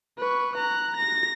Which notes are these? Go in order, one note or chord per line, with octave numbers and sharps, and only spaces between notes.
B4 C#6
A#5 F#6
A#6